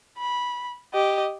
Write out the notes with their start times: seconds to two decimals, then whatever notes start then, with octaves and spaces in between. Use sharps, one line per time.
0.18 B5
0.94 G4 D#5